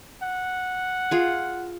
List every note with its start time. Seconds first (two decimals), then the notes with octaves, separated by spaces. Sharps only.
0.22 F#5
1.11 F4 G#4